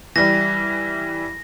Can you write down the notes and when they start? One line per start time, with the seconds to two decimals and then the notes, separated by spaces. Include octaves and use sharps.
0.16 E3 G3 A#6